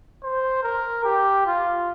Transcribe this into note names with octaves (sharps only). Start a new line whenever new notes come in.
C5
A#4
G4
F4